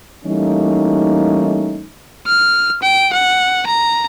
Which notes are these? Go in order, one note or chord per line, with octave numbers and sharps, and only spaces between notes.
E3 G3 A3 A#3 C#4 D#4
F6
G5
F#5
A#5